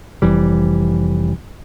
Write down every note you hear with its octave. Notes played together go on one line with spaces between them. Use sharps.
F1 E3 G3